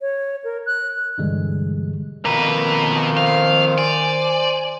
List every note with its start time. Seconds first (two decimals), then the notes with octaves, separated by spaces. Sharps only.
0.01 C#5
0.44 A#4
0.66 F#6
1.18 G2 B2 D3 E3 G3 G#3
2.25 F2 B2 D#3 A#3 B4 A#5
3.17 C5 F5
3.78 D5 G#5